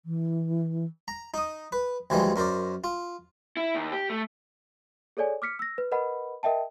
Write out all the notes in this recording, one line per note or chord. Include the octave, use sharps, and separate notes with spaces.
E3
A#5
D#4 D#6
B4
D2 E3 F3 G3 G#3
F#2 A#4 C5 D5
F4
E4
D#2
G4
A3
G#4 A4 C#5 D5 G#5
D6 F6 B6 C#7
E6 A#6
B4
A#4 B4 D#5 F#5 B5
A#4 D#5 E5 G5 A5